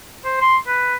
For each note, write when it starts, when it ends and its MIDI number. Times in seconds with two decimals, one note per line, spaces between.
0.24 0.41 72
0.41 0.57 84
0.67 0.95 71